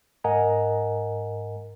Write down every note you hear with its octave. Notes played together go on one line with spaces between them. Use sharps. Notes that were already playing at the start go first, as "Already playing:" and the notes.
G#2 A#4 D#5 F#5 G#5 A#5